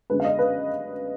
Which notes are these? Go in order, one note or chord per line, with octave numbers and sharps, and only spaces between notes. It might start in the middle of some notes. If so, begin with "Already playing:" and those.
F#2 D3 G#3 B3 B4
F5
D#5
B4